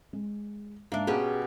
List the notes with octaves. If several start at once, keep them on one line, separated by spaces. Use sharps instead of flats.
G#3
G#2 A#3 D4 E5
B2 C#4 G4 G#4